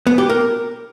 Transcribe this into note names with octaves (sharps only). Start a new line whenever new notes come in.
B3
G4
A#4